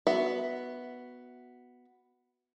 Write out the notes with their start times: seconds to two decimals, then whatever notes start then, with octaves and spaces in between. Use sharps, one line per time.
0.07 B3 F#4 E5